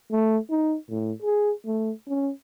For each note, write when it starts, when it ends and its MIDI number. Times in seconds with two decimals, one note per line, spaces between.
0.11 0.38 57
0.50 0.76 63
0.90 1.12 45
1.22 1.52 68
1.66 1.91 57
2.08 2.31 61